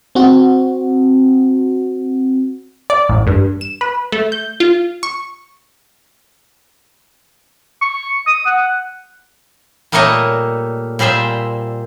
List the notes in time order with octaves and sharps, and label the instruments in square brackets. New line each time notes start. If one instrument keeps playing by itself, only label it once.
[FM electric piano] C4 F#4
[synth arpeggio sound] D5
A1
G2
E7
B4
A3
G6
F4
C#6
[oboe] C#6
D#6
F#5
[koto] A#2 G3 A3 A#3 C#5 D#5
A#2 G3 G#4 C5 E5